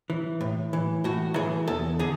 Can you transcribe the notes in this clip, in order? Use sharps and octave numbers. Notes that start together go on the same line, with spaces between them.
E3
A2
E3
A2 F#4
E3 G#4
E2 A4
D3 G#4